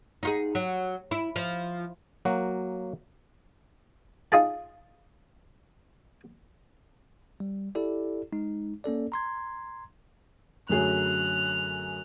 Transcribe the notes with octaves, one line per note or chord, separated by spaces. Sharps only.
D#4 F4 G#4
F#3
E4
F3
F#3 A#3 F#4
D#4 F4 G#4 A5
G3
E4 G4 A4 D5
G#3 D#4
A#3 C#4 A4 D5
A#5 C6 G#6
F#2 D3 F#3 A3 G#4 F#6 F7